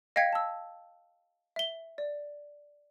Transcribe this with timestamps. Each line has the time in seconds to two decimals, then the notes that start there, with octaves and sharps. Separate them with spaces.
0.16 D#5 F5 G5 G#6 B6 C#7
0.33 A5 E6
1.56 E5 G7
1.98 D5